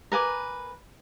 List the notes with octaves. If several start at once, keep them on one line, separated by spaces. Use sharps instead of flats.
A#4 B4 G#5 D6